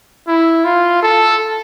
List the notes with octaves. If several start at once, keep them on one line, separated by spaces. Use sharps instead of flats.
E4
F4
A4